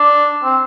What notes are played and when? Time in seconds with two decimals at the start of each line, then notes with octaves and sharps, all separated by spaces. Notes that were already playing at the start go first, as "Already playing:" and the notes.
Already playing: D4
0.44 C4